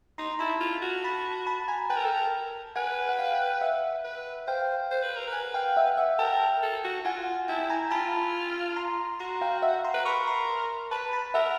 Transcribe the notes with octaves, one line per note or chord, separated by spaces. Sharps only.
D#4 A#5 C6
E4 A5 B5
F4
F#4
A5 B5
A5 B5
G#5 A#5
B4 G5 A5
A#4
A4
A#4
B4 F#5 G#5
F#5
F5 G5
E5 F#5
B4
C5 F5 G5
C5
B4
A#4
B4
F#5 G#5
F5 G5
E5 F#5
E5 F#5
A#4 G5 A5
A4
F#4
F4 F#5 G#5
E4 G5 A5
G#5 A#5
F4 A5 B5
A#5 C6
F#4 A#5 C6
F5 G5
E5 F#5
A#5 C6
B4
A#4 B5 C#6
A#5 C6
B4 A5 B5
A5 B5
A#4 E5 F#5